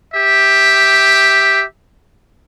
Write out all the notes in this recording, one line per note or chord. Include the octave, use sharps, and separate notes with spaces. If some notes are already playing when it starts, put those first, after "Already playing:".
G4 E5